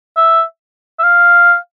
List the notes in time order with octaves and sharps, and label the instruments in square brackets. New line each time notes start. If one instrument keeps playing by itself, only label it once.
[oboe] E5
E5
F5